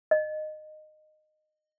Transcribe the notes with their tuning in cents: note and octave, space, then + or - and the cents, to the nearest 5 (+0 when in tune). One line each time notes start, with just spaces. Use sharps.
D#5 -15